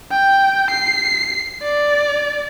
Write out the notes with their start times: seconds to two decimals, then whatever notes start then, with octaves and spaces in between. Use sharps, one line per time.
0.11 G5
0.70 C7
1.62 D5